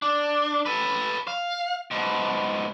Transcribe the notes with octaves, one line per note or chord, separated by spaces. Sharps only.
D4
A4 B4
F5
G#2 B2